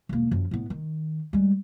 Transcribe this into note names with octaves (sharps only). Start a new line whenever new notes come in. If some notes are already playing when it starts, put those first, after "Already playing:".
E1 A#3
F#2 F3
A2 B3
D#3
G3 G#3